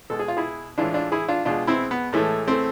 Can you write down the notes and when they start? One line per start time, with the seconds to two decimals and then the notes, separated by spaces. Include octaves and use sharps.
0.10 B2 G#3 A4
0.19 G#4
0.28 F4
0.37 E4 G#4
0.78 A2 E3 G#3 D4 F4
0.94 D4 F4
1.12 E4 G#4
1.28 D4 F4
1.45 B2 G#3 D4 F4
1.67 C4 E4
1.91 B3
2.13 A2 E3 G#3 A3
2.48 A3 C4